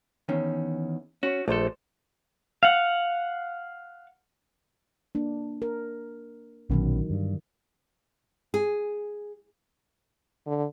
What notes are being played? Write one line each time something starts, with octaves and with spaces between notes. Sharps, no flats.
E2 D#3 C#4
C#4 F#4
A#1 A3 A4 C5
F5 F#5
A#3 D4
A#4
A#1 B2 D3 D#3 F#3 C#4
G2
G#4
D3